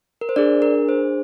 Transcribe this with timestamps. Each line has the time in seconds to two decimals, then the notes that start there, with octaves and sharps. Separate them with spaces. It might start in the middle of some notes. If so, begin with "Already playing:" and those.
0.21 A#4
0.29 C5
0.36 D4 G#4 D5
0.62 A#4
0.89 C5